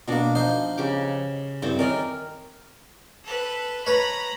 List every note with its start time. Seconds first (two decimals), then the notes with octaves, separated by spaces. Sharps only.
0.08 B2 A#3 D4 F#4
0.35 F3 D#4 C5
0.77 C#3 G4 D6
1.62 G2 C4 E4 A4
1.79 D#3 C#4 A#4 D5 D#5
3.24 A4 B4
3.87 B4 C#5 A#5 B5